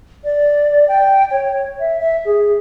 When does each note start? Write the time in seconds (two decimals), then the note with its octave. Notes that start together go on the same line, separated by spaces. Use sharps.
0.24 D5
0.88 G5
1.31 C#5
1.79 E5
2.00 E5
2.25 G#4